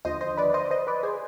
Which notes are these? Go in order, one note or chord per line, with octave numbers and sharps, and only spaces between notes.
D#2 D3 F3 C5 D#5
C5 D#5
B4 D5
C5 D#5
C5 D#5
B4 D5
G#4 C5